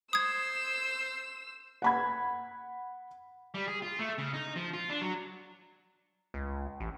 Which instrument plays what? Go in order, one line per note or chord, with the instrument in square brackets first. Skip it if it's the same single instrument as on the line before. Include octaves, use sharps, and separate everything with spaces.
[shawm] C5 [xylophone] D#6 G#6 [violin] E6
[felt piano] F#5 B5 G#6
[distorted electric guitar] G3
G#4
F4
A3
C#3
D#4
F3
F4
D4
F#3
[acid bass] C#2
A1